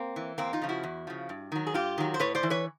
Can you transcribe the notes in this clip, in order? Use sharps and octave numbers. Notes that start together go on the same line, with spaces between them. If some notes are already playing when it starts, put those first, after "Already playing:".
Already playing: A#3 C4
E3
E2 A#3 C4
D#4 F4
C#3 F3
E4 F#4
E2
C#3 F3
G2
D#3 F#3
G#4
G2 F4 G4
D#3 F#3
C5
A2 B4 C#5
C5 D5
E3
B4 C#5